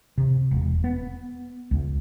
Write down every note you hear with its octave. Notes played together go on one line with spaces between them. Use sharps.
C3
E1
B3
C#2